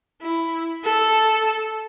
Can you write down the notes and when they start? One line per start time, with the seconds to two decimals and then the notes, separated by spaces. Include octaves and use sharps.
0.21 E4
0.84 A4